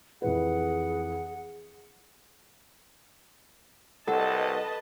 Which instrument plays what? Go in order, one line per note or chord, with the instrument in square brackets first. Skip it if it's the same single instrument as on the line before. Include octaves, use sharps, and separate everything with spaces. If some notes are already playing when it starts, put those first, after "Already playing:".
[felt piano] F2 E3 B4 [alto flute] G#4 [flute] F#5
[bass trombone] C2 [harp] A4 [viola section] B4 D#5 A5 [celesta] F#5